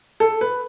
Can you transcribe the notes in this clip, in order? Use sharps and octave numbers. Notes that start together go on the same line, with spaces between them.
A4
B4